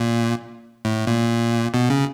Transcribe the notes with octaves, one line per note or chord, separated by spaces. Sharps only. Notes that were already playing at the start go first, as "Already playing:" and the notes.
Already playing: A#2
A2
A#2
B2
C#3